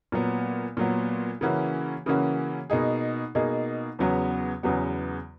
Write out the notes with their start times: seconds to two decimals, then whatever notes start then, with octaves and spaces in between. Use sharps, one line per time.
0.12 A#2 F#3 B3
0.77 A#2 F#3 B3
1.41 C#3 E3 A#3 C#4 F#4
2.06 C#3 E3 A#3 C#4 F#4
2.70 B2 A#3 D#4 G#4
3.35 B2 A#3 D#4 G#4
3.99 E2 C#3 F#3 B3 F#4
4.63 E2 C#3 F#3 B3 F#4